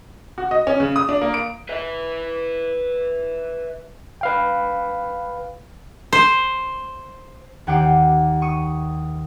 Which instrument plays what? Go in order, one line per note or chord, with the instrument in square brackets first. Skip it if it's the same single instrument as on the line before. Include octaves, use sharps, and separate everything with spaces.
[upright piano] F#4
D#5
C#4
C#3
D#6
D4
A#3
D7
[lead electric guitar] B4 E5
[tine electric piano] B4 F5 G5
[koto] C5
[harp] D#2 F#5 G5 D6 C7
C#6 D#6